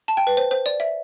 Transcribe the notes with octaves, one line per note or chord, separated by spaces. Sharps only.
A5
G5
B4
C5
C5
D5
E5